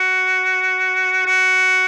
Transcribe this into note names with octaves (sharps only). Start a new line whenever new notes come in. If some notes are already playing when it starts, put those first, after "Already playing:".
Already playing: F#4
F#4